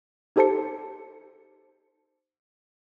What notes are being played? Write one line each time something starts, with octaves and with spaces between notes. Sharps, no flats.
D#4 G4 A4 C5 A5 C#7